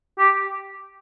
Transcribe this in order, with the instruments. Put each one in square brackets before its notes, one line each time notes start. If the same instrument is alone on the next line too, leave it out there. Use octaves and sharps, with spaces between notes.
[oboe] G4